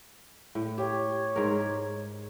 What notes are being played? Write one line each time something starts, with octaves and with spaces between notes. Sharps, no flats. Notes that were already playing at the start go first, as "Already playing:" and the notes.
A2
G4 C#5
G#2 A#4